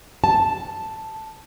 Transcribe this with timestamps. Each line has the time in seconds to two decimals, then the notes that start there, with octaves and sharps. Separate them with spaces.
0.24 A5